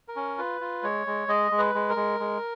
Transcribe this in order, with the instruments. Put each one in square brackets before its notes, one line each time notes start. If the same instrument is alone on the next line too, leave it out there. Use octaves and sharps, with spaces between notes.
[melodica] A#4
C#4
F4 B4
F4
G#3 C#5
G#3
G#3 D#5
G#3
B4
G#3
A#4
G#3
G#3